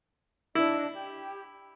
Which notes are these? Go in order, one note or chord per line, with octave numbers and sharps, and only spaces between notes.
D4 E4 D#5
G4